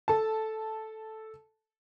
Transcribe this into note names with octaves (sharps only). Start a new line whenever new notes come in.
A4 A5